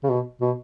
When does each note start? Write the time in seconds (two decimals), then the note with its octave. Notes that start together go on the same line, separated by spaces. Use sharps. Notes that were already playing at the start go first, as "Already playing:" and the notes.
0.04 C#3
0.10 B2
0.41 B2